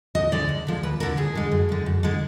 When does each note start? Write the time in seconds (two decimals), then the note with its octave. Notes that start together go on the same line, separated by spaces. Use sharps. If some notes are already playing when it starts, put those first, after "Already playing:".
0.15 D2 D#5
0.32 D3 F3 G#3 D5
0.49 D2
0.67 D3 F3 G#3
0.83 D#2 B4
1.00 D3 G#3 A#4
1.17 D#2 G#4
1.35 D3 G#3
1.51 F#2
1.69 D3 G#3
1.86 F#2
2.03 D3 G#3